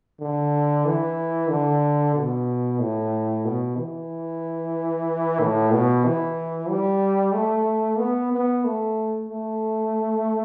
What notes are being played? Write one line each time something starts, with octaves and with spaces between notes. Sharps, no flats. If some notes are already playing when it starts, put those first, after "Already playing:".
D3
E3
D3
B2
A2
B2
E3
A2
B2
E3
G3
A3
B3
B3
A3
A3